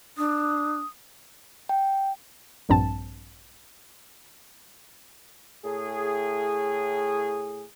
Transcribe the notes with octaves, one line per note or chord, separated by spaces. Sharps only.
D4 D#6
G5
A#1 G2 C4 A5
A2 G#4